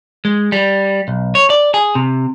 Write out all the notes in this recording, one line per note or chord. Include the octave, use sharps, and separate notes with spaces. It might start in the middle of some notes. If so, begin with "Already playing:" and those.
G#3
G3
B1
C#5
D5
G#4
C3